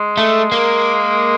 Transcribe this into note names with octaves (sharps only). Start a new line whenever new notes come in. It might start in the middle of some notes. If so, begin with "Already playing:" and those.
Already playing: G#3
A3
A#3